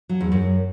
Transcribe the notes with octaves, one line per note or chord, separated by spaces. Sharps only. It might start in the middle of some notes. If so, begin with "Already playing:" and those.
F#3
E2
F#2